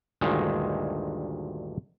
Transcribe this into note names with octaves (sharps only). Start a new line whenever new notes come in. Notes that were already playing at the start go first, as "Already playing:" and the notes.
D2 G2 A#2 D#3 G#3